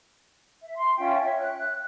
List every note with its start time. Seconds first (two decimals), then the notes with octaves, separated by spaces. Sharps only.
0.63 E5
0.76 C6
0.98 C#4 F4 E5 G5
1.22 C#5 E5
1.40 F#6